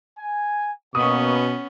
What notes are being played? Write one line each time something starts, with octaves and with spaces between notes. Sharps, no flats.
G#5
B2 A#3 B3 C#4 C#6 D#6